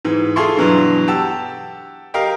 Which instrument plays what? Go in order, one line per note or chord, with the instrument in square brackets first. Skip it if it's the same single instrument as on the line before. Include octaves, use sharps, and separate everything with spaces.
[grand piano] G#2 E3
F4 G#4 A4 E5 C6 C#6
G2 B2 E3 F#3 D4
G4 F#5 A5 E6
G4 A#4 D#5 F5